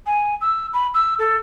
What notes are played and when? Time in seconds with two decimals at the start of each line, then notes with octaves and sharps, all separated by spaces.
0.06 G#5
0.41 E6
0.73 B5
0.94 E6
1.19 A4